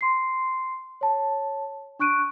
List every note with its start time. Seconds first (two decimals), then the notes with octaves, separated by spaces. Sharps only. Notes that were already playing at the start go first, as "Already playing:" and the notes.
0.01 C6 C7
1.01 C#5 A5
1.99 D4 C#6 F#6 D7 D#7